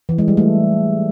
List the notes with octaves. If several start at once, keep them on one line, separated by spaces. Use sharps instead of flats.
E3
G#3
G3
A3